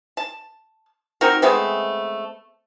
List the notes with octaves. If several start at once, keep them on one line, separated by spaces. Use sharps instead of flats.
A5
C4 D#4 F#4 A#4
G#3 A3 B3 C4